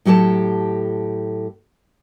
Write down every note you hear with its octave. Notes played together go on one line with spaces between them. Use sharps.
A2 F#3 G4 A4 A5